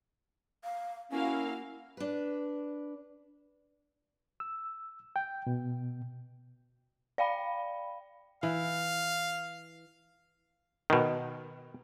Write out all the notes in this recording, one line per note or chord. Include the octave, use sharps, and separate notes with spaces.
F5
A#3 C#4 E4 F#4 F5
D4 B4
E6
G5
B2
D5 F5 G5 B5
E3 F5
B2 D#3